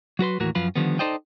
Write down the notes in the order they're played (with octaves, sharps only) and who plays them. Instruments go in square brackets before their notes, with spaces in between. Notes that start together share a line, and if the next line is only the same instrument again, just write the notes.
[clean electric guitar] F#3 F#4 B4 C6
D#2 A2 E3 F#4 A#4
F#2 F3 F4 B4 B5
D3 D#3 F3 G3 B3
D#4 A4 C5 D5 D#5 G5